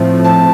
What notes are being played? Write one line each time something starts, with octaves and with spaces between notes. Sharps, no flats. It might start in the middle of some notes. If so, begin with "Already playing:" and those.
Already playing: A2 F3 A3 C4
A5